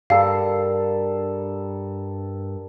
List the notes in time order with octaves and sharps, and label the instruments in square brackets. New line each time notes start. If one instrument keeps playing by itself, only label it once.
[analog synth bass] G2 [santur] G3 A4 A#4 [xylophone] F5